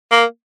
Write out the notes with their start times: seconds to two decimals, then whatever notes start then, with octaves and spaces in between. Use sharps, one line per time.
0.11 A#3